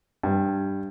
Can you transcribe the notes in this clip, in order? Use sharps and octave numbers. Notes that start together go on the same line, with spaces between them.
G2